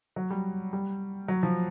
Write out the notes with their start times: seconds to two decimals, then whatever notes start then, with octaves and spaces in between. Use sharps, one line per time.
0.16 F#3
0.30 G3
0.73 G3
1.28 F#3
1.43 F3